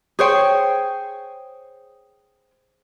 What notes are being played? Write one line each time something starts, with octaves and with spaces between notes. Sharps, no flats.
G#4 C5 C#5 G5